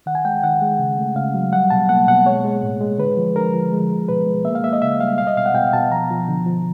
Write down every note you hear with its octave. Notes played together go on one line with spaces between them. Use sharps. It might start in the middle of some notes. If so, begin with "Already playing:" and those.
D#3 F#5
G#5
G#3 G5
D#3 F#5
G#3
C#3
A3
C#3 F5
F#3
G3 F#5
B2 A5
A#3 F#5
B2 F#5
G#3 C#5
G#3
A2
G#3
D3 B4
F3
D3 A#4
F3
G#3
G#3
B2 B4
G#3
A#3 E5
F5
A#3 E5
D#5
C#3 E5
G3 F5
B2 F5
D#5
B2 F5
F#5
B2 G5
B2 A5
F3 A#5
F3
D3
F3